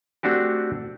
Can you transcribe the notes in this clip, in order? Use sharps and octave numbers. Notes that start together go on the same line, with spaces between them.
A3 C4 D4 F#4 G4